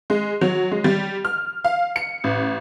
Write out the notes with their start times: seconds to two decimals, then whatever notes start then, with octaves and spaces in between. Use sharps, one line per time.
0.10 G#3
0.41 F#3
0.71 G#3
0.84 G3
1.25 F6
1.64 F5
1.96 C#7
2.24 A1